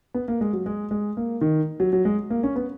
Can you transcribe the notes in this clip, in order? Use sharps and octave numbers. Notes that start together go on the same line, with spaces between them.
B3
A#3
G#3
F#3
G#3
G#3
A#3
D#3
F#3
F#3
G#3
A#3
C#4
B3